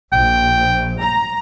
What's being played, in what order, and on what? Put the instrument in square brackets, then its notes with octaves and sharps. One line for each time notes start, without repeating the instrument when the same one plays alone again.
[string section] A#1 [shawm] G5
[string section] A#5